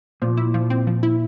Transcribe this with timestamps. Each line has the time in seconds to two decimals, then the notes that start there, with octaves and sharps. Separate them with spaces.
0.22 A#2 F3
0.37 E4
0.54 F3
0.70 C4
0.87 F3
1.03 E4